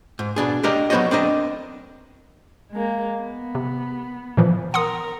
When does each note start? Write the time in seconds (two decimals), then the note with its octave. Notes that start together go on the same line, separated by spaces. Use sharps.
0.19 G#2
0.36 B2 D4 G#4
0.63 D4 G4 A#4 D#5
0.90 F#3 B3 G4 C5 C#5 D#5
1.11 C4 D4 A#4 D#5
2.72 G#3 A#3
3.20 B3
3.55 C3
4.37 A#2 E3 F3
4.74 A#4 F#5 C6 D#6